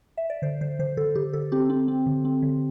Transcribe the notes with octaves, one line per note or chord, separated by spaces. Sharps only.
E5
D5
D3 C5
D3 C5
D3 C5
D3 A4
D3 G4
D3 A4
C4 G4
C4
C4
D3
C4
D3